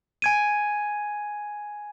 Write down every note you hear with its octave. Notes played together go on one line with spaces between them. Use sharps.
G#5 G#6 D#7